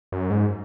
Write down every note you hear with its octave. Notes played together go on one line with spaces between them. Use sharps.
F#2
G#2